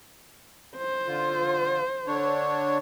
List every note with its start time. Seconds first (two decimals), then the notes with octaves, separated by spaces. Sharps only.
0.77 C5
1.07 D3 F4
2.07 D3 D4 C#5